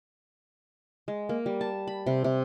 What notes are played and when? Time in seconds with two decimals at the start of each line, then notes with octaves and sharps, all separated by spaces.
1.08 G#3
1.29 A#3
1.46 G3
1.61 A5
1.87 B5
2.06 C3
2.24 C3